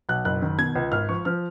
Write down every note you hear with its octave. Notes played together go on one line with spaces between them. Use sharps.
B1 F#6
F#1 F#6
D#3
B2 G#6
C#2
G#1 F6
F3 C#6
F3 F6